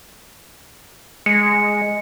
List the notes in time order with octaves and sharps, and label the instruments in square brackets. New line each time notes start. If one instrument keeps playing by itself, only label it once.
[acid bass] G#3 [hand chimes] C#7